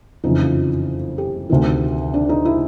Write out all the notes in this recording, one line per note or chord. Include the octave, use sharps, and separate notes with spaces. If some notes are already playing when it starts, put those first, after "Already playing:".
F#1 F2 C#3 E3 D#4
F4
G4
D2 C3 D#3
D4
D#4
E4